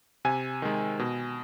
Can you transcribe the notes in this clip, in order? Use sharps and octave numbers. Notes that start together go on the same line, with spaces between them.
C3 G#5
D#3 G#3
B2